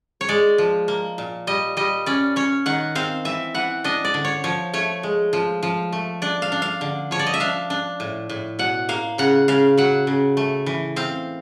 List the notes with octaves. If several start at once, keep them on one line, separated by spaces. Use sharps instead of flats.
C#5
G#3 D5
F3
A#3
A#2
G3 D#5
G3 D#5
C#4 D5
C#4 C#5
D#3 F#5
C4 F5
E3 E5
E3 F#5
D4 D#5
D5
D3
C#5
F3 C#5
A3 C#5
G#3
F3
F3
A3
D4 D5
F5
D4
F5
D3
F3 C#5
D5
D#5
E5
D4 F5
D4
A2
A2
B2 F#5
A#3 F5
C#3 F#5
C#3 F5
F#3 F#5
C#3
A3
E3
C4 F5